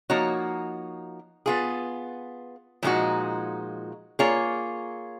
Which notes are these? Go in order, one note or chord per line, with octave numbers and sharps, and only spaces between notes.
F3 A#3 D#4 F#4 C#5
B3 F4 G#4
A#2 F3 G#3 D#4 F#4
A#3 F4 G#4 C#5